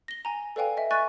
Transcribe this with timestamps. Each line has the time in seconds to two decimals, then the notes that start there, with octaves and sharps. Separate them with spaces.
0.08 A#6 G7
0.25 G#5 A#5
0.56 A4 B4 D5 F5 G5 G#5
0.77 D#5 E5
0.91 D#5 G#5 C#6 F#6 A6